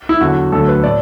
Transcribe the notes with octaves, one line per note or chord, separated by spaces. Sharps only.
E4
E2 D3 F#3 F#4
D2 D3 F#3 A3 A4
B4
A2 A3 D5